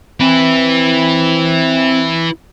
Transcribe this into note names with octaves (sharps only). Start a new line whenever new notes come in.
C4 E4 B4